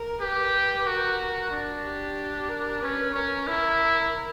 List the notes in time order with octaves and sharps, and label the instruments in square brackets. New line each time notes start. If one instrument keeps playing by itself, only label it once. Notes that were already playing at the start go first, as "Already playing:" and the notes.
Already playing: [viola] A#4
[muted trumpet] G4 [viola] B4
[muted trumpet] F#4 [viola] A#4
[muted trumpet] D4
[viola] G4
A#4
[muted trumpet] C#4 [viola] B4
[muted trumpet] C#4 [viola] A#4
[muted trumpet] E4